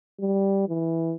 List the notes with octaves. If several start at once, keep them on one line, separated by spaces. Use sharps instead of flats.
G3
E3